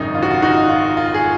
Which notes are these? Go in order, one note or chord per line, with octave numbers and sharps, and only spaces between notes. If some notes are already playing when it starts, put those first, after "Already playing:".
Already playing: G#1 F#2 C#3 D#4
F4
F#4
F4
D#4 F#4
F4
F4
G#4